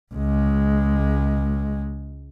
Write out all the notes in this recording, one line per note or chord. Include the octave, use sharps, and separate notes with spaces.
C#2 G#3